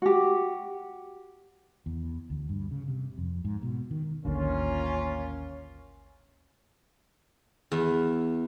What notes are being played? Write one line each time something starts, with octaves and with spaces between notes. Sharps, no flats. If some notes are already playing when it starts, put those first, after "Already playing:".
F#4 G4
E2
D2
G2
C#3
C3
F2
G#2
B2
D#3
A1 D#2 D3 A#3 C#4 F4
E2